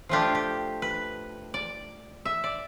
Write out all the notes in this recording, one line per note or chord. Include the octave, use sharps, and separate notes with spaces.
F3 A3 D4 F4 G4
G4
B4
D5
E5
D5